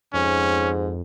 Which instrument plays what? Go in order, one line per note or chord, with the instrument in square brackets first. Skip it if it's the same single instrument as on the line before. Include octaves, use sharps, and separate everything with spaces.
[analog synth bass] F2 [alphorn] G#2 [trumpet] C#4